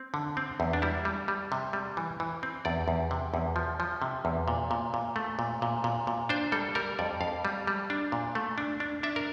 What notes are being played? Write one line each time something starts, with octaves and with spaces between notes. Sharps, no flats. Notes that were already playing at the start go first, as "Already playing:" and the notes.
Already playing: C4
D3
C4
E2
D4
G3 E4
G3
G3
C3
G3
E3
E3
C4
E2 D5
E2
C3
E2
F3
F3
C3
E2
A#2
A#2
A#2
A3
A#2
A#2
A#2
A#2
D4 C5
G3 A4
G3 A#4
F2 D5
F2 F5
G3
G3
D4
A#2
A3
D4
D4
D4 E5
A#4